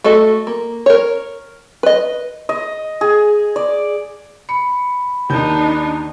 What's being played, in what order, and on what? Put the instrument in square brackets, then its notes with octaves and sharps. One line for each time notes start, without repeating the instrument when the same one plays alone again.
[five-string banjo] A3 F#4 A4 D#5
A#3
A#4 C#5
B4 D#5
[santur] D#5
G#4
D5
[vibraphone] B5 [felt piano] C#7
[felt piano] D#2 G6 [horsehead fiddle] D4 D#4